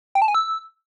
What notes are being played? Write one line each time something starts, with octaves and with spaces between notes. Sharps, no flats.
G5
A5
G#5
E6